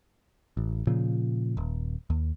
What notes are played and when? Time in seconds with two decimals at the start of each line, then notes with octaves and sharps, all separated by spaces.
0.57 A1
0.87 A#2 C#3 F3
1.57 D#1
2.10 D#2